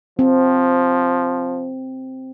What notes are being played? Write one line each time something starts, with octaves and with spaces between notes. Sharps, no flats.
F3 C4